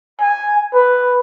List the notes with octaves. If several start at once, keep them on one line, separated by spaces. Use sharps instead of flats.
G#5
B4